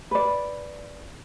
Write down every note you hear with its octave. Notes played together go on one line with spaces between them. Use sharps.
B4 D5